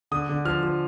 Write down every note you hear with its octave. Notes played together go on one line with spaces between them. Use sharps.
D3 D#6
D3
F3 F6
F3